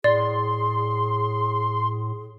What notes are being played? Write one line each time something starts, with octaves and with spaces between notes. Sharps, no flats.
A2 G#4 D5 C6